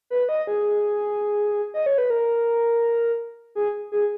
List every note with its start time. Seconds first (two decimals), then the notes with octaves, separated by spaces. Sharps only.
0.10 B4
0.29 D#5
0.47 G#4
1.74 D#5
1.86 C#5
1.98 B4
2.10 A#4
3.55 G#4
3.92 G#4